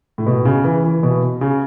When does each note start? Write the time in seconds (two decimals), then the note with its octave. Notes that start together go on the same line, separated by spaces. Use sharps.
0.18 A2
0.27 B2
0.45 C#3
0.64 E3
0.84 E3
1.03 B2
1.41 C#3